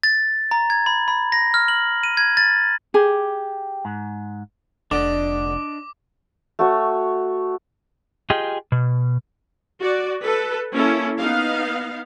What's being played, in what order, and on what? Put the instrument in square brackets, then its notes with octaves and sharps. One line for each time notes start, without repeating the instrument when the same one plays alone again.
[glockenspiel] A6
A#5
G#6
B5
B5
A#6
F6
F#7
D#7
G#6
A6
[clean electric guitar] G4 [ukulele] G#4
[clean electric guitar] G#2
[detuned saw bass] F1 [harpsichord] D3 [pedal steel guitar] D4 D5 D#5 [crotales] D6
[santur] A3 F#4 C#5
[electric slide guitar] F4 G4 G#4 D#5 G5
B2
[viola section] F#4 D5
A4 B4
A#3 C#4 E4 A4
B3 D#4 F5